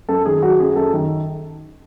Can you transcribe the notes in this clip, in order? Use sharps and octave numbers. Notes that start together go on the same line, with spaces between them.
F#2 A4
D#3 G#4
F#3 F#4
F#2 G#4
F#2 A4
D#3